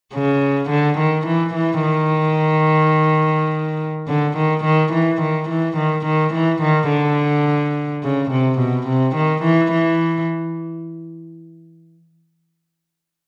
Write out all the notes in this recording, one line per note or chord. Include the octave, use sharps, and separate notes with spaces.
C#3
D3
D#3
E3
E3
D#3
D3
D#3
D#3
E3
D#3
E3
D#3
D#3
E3
D#3
D3
C#3
C3
B2
C3
D#3
E3
E3